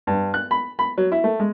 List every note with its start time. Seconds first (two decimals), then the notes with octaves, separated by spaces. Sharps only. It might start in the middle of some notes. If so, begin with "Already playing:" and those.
0.07 G2
0.34 F#6
0.51 B5
0.79 B5
0.98 F#3
1.12 E4
1.24 A3
1.40 G#3